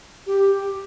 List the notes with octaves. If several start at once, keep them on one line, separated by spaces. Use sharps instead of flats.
G4